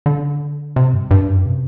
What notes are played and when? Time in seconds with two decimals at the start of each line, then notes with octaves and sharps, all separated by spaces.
0.06 D3
0.76 C3
0.94 G2
1.11 G2
1.29 F#2
1.46 C3